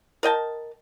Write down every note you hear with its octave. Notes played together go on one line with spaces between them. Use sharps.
A#4 D#5 G5 A5